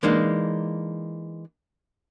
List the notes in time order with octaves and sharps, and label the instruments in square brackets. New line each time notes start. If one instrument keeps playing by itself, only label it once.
[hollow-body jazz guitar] E3 G#3 A#3 D4 D#4